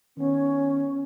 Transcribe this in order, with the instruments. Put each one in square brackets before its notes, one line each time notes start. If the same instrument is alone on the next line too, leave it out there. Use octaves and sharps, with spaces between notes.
[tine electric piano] D#3 B3 [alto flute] C#4